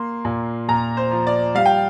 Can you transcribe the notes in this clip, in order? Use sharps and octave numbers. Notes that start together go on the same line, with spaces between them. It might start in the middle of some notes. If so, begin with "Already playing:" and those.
Already playing: A#3 C6
A#2
A#2 A#5
C5
F3
D5
G3 F5
G5